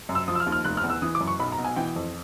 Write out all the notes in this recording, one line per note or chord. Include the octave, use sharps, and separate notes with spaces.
F#2
E6
F3 D#6
E6
F6
D#2
F6
F1 F#6
F6
E2
E6
E3 D#6
D6
F#2
C#6
B1 B5
A#5
B2
G#5
E3 G5
F2